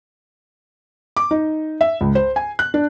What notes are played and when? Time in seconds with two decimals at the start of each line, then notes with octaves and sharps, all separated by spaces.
1.17 D6
1.31 D#4
1.81 E5
2.01 C#2
2.15 C5
2.36 G#5
2.59 F#6
2.74 D4